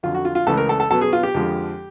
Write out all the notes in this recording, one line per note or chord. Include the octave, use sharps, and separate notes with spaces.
F2 D3 F#3 F4
F#4
F4
F4
C#2 C#3 E3 A3 A4
A#4
A4
A4
B2 F#3 B3 A4
G#4
F4
G4
F2 D3 F3 G#3